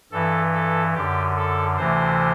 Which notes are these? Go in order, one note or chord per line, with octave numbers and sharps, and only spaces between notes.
G2 E3 A4
A4
F#2 D3 G4
A4
D2 C3 E3 C5